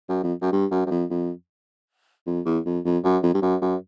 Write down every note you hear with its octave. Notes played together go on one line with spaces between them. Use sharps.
F#2
F2
F#2
G2
F#2
F#2
F2
F2
F2
E2
F2
F2
F#2
F2
G2
F#2
F#2